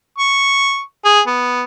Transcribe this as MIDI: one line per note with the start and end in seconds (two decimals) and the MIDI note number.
0.18 0.81 85
1.05 1.21 68
1.27 1.63 59